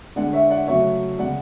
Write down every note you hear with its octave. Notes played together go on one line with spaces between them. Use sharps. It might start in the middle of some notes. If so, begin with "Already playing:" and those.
D3 G#3 D5 F#5
C#5 E5
D5 F#5
C#3 F#3 A3 C#5 E5
C#3 G#3 D5 F#5